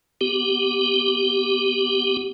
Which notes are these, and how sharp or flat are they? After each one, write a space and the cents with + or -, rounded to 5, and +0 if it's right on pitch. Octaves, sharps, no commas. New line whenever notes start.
B3 +0 G4 -5